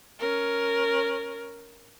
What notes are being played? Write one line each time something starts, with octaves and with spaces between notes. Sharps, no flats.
C#4 A#4